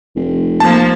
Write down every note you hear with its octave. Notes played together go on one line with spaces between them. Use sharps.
F1
F3 A#3 A5